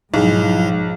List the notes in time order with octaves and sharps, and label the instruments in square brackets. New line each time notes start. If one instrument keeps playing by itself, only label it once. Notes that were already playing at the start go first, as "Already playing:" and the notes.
[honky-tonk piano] B1 [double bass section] G#2 F3 [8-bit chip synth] F#3 E4 [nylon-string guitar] D#4 G#4